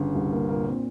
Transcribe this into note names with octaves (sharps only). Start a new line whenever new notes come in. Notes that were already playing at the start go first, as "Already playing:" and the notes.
Already playing: G1 C#3
C2
A#3
A#2 A#3
C4